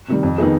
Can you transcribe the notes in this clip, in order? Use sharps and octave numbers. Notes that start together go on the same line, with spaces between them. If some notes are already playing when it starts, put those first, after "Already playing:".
C3 D#3 G3
F2
D#3 B3 D#4 G#4